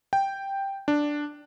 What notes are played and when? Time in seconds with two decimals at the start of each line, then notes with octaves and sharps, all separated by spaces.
0.13 G5
0.88 D4